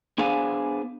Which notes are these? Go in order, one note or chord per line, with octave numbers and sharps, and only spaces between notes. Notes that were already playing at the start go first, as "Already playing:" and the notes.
B3 D4 G#4 C5 F5 G#5